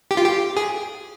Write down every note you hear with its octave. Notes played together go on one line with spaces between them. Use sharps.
G4
F4
G4
G#4